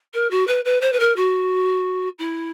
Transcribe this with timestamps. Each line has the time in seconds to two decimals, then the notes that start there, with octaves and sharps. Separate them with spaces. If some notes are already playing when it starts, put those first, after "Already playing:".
0.14 A#4
0.31 F#4
0.47 B4
0.65 B4
0.81 C5
0.92 B4
1.00 A#4
1.16 F#4
2.19 E4